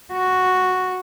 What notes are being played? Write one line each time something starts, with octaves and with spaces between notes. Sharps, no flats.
F#4